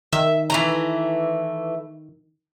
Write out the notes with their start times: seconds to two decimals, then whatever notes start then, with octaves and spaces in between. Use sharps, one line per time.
0.13 D#3 E5
0.50 E3 A3 A#5